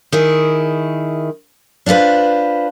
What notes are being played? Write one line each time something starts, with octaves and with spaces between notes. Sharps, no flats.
D#3 E4 G#4
D4 F4 F#4 B4 C5